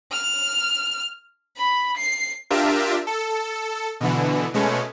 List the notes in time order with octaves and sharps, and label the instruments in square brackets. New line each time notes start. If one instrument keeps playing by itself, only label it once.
[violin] F6
B5
C7
[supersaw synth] D4 F4 G4 A#4 E5
A4
B2 D3 E3
B2 G#3 A3 C#4